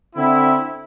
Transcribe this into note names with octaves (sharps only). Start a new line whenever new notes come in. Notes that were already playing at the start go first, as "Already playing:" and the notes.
D3 C4 E4